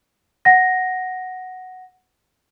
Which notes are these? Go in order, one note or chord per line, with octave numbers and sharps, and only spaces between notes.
F#5 A#6